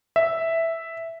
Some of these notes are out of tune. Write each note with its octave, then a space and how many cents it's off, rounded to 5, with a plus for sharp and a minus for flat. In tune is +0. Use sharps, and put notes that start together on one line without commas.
E5 +0